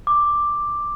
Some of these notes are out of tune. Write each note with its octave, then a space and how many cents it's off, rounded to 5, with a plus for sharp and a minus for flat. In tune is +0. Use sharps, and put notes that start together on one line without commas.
D6 +5